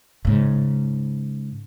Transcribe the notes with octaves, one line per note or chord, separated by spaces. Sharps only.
G#2 C#3